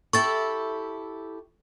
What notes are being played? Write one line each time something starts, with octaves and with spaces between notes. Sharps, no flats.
E4 G4 A4 C#6 A6